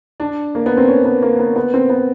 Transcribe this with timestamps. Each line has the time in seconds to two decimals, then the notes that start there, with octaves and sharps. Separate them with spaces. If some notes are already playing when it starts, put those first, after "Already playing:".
0.20 D4
0.55 A#3
0.66 B3
0.77 C4
0.88 C#4
1.05 B3
1.22 A#3
1.39 B3
1.56 B3
1.74 C4
1.90 B3